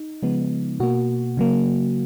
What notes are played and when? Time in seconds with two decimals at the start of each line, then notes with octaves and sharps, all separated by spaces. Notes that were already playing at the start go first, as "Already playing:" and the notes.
Already playing: D#4
0.23 C#3 F3 G#3 B3
0.80 B2 A#3 F#4
1.37 C#3 F#3 A#3